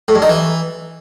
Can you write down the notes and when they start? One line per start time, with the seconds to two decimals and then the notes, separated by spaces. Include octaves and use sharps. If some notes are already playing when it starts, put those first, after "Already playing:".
0.08 A2
0.15 G2
0.22 D#3
0.29 E3